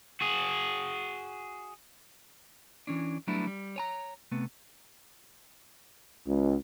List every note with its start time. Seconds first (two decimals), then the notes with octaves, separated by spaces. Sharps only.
0.21 F#4 G#4
2.87 E3 C#4 D4
3.27 F#3 G3 A3 B3 D4 E4
3.47 G3
3.76 C#5 G#5 A#5
4.32 C3 A3 B3
6.27 C#2